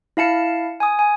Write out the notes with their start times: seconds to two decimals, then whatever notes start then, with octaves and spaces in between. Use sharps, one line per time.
0.17 E4 F5 A5 C#7
0.80 G#5 D#6
0.99 G#5